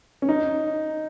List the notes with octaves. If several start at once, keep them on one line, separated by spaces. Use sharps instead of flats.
C#4
D#4